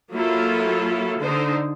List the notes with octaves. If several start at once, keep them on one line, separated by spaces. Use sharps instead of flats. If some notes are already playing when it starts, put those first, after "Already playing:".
F#3 A#3 E4 F4 A4
D3 D#4 C5